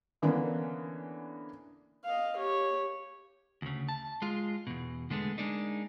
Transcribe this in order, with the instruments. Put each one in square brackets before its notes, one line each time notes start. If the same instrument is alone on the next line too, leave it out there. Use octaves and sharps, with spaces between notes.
[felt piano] D3 E3 A#3 B3 C#4 D4
[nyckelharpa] D#5 F5
G4 C#5
[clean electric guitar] D2 C#3
A5
G#3 F4
E2 B2
D3 G#3 A3 B3
G#3 A#3 D4 D#4